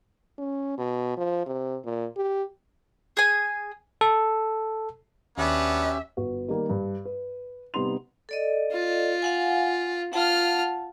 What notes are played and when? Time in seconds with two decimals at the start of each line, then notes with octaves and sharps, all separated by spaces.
0.38 C#4
0.78 B2
1.17 F3
1.46 C3
1.84 A#2
2.16 G4
3.17 G#4 G#5
4.01 A4
5.38 D#2 B3 C#4 D4 F#4 G4 E5
6.17 G1 F#4 B4
6.48 D#3 G3 A#3
6.69 G2
7.05 B4
7.74 C3 G3 B3 D#4 C6 F7
8.29 A4 D5 D#5
8.72 F4
9.22 F5 F#5 G#5
10.13 F4 F#5 A5 F6